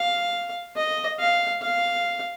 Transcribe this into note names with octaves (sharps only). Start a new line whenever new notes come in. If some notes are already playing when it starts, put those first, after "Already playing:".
Already playing: F5
D#5
F5
F5